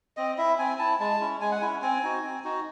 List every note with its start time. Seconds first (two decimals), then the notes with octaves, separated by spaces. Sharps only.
0.17 C4 D#5
0.38 E4 E5
0.59 C4 G#5
0.79 E4 A5
1.00 G#3 A5
1.20 C#4 E4
1.41 G#3 G#5
1.51 F#5
1.61 C#4 E4 G#5
1.82 C4 G#5
2.03 D#4 F#4
2.23 C4
2.44 D#4 F#4